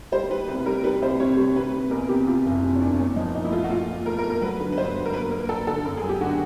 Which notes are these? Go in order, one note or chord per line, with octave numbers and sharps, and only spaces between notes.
G3 C5
G3 B4
C2 B4
G3 A#4
G3 B4
C2 C5
C3 C#5
G3
C3 B4
C3
E2 A#4
C3 G4
C3 F4
F#1
C3
C#4
E2 D4
A#2 C#4
F3 D#4
A#2 D#4
E4
A3 F4
F#4
A#2 F4
A#2
A3 A#4
A#4
A3
A#4
F#3 B4
D3
B4
G2 C5
F#3
A#4
A#3 B4
A#3 A#4
A#3 A4
D3 A4
F#2 A#4
G#4
F#3
G4
D3 F#4